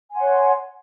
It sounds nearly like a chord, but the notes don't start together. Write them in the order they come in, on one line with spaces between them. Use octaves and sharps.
G#5 C6 F#5 C#5